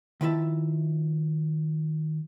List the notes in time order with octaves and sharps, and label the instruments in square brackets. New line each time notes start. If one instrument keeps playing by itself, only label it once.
[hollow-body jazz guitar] D#3 F3 E4 A#4 E5 A5